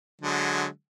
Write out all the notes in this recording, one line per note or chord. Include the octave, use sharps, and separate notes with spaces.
D3 F#3 G#3